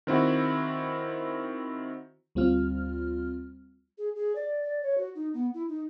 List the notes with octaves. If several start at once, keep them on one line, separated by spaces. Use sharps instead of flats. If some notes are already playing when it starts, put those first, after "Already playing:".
D#3 C4 E4 F#4
D2 G3 C4 F4 F6
G#4
G#4
D5
D5
C#5
F#4
D#4
B3
E4
D#4